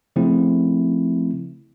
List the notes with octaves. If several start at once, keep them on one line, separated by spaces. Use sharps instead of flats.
C#3 F3 A3 C4 E4